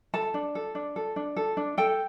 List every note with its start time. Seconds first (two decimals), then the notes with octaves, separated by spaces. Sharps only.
0.14 A4 A5
0.34 D4
0.55 A4
0.75 D4
0.96 A4
1.16 D4
1.36 A4
1.57 D4
1.78 A4 G5